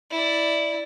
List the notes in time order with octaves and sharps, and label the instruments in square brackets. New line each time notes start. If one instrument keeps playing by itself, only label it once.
[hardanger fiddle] E4 D5